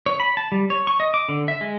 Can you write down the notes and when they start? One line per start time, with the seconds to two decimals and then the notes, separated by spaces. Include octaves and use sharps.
0.06 C#5
0.20 B5
0.37 A5
0.52 G3
0.70 C#5
0.87 C#6
1.00 D#5
1.14 D6
1.29 D3
1.48 E5
1.61 G#3